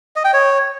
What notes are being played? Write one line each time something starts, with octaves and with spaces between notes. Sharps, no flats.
D#5
G5
C#5